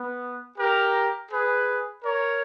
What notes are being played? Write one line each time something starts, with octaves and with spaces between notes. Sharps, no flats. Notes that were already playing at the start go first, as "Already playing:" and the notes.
Already playing: B3
G4 A#4
G#4 B4
A#4 C#5